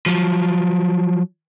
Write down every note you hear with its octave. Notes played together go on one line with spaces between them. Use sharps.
F3 F#3